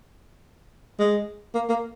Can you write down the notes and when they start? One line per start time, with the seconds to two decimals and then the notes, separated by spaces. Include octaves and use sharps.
0.99 G#3
1.55 A#3
1.69 A#3